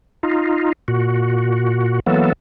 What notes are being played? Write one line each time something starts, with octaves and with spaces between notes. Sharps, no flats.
D#4 F4
A#2 F#4
E3 F#3 A#3 B3 A4